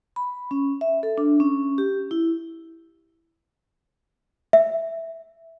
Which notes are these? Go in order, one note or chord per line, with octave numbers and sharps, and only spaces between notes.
B5
C#4
E5
A4
D4
C#4
G4
E4
E5